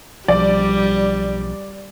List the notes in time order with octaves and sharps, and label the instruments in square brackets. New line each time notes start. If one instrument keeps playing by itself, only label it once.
[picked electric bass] B1 F3 [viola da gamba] G3 [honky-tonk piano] D5